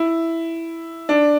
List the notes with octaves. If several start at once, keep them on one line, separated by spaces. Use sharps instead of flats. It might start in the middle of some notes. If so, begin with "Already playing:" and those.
Already playing: E4
D4